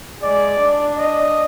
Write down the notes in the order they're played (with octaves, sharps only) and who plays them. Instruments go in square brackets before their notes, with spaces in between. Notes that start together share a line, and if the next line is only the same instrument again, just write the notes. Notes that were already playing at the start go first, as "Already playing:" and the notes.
[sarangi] G#3 [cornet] D5
[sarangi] D4
[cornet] D#5